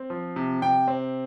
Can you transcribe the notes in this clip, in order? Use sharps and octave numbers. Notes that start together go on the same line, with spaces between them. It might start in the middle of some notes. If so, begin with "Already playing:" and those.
Already playing: C4
F3
C3
C3 G5
C4